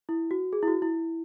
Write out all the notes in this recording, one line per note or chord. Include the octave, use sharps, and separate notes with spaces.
E4
F#4
G#4
E4
F#4
E4